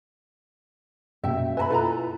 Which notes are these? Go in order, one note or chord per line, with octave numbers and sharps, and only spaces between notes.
F#2 B2 A#3 E5 G5
B4 E5 G#5 A5 B5
E4 F4 A4 B4 A#5